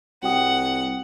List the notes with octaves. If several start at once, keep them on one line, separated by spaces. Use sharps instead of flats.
C2 F#4 F#5 G5 D#6